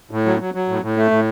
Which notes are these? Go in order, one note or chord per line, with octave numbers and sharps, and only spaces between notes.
A2
F#3
F#3
F#3
A2
A2
A3
A2